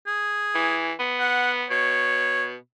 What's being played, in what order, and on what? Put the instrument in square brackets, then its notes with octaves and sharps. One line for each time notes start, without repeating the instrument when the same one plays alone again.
[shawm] G#4
[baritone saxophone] E3
B3
[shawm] F#5
[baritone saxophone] B2 [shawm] C#5